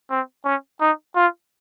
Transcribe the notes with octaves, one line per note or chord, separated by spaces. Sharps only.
C4
C#4
D#4
F4